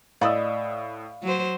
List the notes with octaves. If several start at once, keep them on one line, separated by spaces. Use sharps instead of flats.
A2 D5 D#5 F5 B5 D#6 E6
F#3 C5